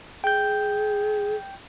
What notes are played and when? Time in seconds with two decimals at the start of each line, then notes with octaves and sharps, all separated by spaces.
0.24 G#4 G5 G6